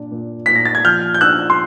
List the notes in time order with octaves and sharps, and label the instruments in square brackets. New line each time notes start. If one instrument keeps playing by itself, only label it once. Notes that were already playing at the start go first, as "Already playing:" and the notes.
Already playing: [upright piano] A#2 D4
A#2
[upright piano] A#2 [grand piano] B6
[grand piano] A#6
A6
G#6
[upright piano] F3 [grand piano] F6 G6
[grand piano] G6
[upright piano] D4 [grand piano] E6 F#6
[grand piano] C6